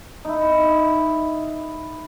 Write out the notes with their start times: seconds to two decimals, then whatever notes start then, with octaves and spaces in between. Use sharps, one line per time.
0.25 D#4 E4